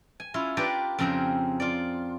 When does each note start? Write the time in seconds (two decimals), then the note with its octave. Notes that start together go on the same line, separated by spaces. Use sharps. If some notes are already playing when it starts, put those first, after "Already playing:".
0.20 G#5
0.34 C#4 E4 F4 G#4
0.57 D4 F4 G4 A#4 B4 D5
0.99 F2 C#3 C4 G#4 A#4
1.60 F4 D5